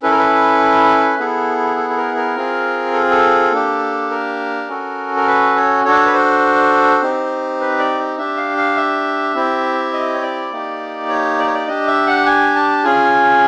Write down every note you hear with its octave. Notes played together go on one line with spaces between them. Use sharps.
C#4 E4 A4 B4
A#4
B4
B3 E4 G#4 A4
A4
A4
A#4
A#4
C4 F4 G#4
A4
A4
A#3 D4 G4
A#4
C#4 F#4 A4
A#4
B4
C#5
D4 F#4 A4 C#5
B4
C5
C4 D#4 G4
B4
D5
D4 G4 E5
F5
F5
E5
C4 E4 G4
D#5
C#5
D5
A#3 D#4 G4
C#5
D5
C#5
D5
D4 G4 D#5
E5
F#5
G#5
A5
C#4 F4 G#4 G#5